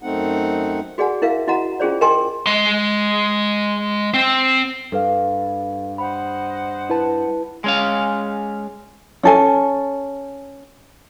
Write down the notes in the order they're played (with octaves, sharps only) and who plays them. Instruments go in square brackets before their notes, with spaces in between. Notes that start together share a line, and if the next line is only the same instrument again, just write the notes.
[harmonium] F#2 A3 C4 D#4 F#5
[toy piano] F#4 G#4 D5 F#5 G#5
E4 A#4 E5 F5
E4 F#4 D#5 F#5 A#5
C#4 F4 G#4 C5 D5
G#4 A#4 D#5 G5 G#5 C6
[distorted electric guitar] G#3 C6
C4
[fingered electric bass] G2 [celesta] A4 B4 F5
[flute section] C5 D#5 F#5 [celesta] B5
[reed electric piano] E4 B4 A5
[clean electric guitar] G#3 C#4 F5
[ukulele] C#4 A4 G#5